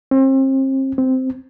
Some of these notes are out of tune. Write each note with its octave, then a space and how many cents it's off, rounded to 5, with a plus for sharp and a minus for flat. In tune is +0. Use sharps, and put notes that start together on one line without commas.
C4 +35
C4 -10